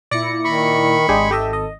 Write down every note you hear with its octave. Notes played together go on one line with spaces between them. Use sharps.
A#2 E4 D5 A#6 C#7
D#3 B5 C#6
G#1 G#3 D4 G4 G#4
G4 A4 D#5 E5
D#5